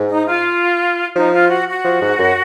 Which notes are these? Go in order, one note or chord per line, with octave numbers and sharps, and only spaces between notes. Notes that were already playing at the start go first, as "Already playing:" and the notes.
Already playing: G#2
D#4
F4
F3 D#4
F4
F#4
F#4
F3
G#2
F#2